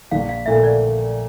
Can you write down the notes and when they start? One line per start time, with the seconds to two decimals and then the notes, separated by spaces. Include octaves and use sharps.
0.11 A#1 F5
0.29 F5
0.46 A#2 A3 E5
0.64 D5